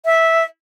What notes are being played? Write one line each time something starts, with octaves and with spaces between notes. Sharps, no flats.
E5